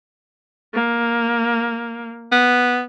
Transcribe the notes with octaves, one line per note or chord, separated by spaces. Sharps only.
A#3
B3